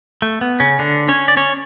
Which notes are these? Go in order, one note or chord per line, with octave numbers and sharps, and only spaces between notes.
A3
B3
C#3 C#4
D3 D4
C#4 C#5
D5
C#4 C#5